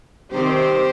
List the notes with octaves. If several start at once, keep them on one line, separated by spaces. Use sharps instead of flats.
C3 D#3 G3 C4 G4 C5